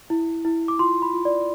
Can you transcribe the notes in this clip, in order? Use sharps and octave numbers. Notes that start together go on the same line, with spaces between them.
E4
E4
D6
F4 C6
B5
F4
D5